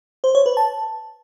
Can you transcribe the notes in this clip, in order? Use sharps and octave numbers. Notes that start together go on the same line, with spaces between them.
C5
C#5
B4
A5